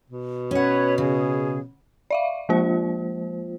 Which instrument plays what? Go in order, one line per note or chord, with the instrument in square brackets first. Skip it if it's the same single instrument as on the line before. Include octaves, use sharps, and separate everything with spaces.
[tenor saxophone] B2
[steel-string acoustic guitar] C#4 F#5 [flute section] B4 C#5
[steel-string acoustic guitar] C#3 [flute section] G#4
[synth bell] D5 E5 F5
F3 G#3 A#3 F4 C5